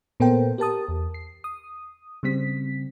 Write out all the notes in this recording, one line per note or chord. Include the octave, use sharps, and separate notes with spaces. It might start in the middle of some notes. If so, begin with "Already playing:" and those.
A#2 B3 A4 A#4 C5 G5
G4 A#4 A5 D#6
E2
C7
D#6
C#3 G3 C4 B6